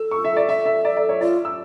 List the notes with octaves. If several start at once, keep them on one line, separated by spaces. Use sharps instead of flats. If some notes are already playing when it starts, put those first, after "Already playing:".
Already playing: A4 E6
C#6
E5
D5
A4 E5
E5
D5
D5
C#5
F4 D5
E6